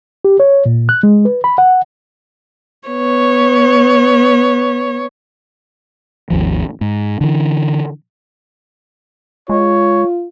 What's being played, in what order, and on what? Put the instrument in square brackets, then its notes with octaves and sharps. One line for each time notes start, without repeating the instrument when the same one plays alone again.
[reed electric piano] G4
C#5
A#2
F#6
G#3
B4
B5
F#5
[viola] B3 C#5
[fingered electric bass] G#1 D#2 F3
G#2
D3 E3
[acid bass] G#3 [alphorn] F4 [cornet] C#5